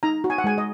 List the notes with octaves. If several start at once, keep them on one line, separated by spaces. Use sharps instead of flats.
D#4 A#5
F#4
G#5
F#5
G#3 G#5
D#5